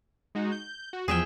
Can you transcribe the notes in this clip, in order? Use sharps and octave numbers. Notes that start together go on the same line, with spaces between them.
G#3 D#4 F#4
G6
F#4
E2 F3 G#4 E5 G5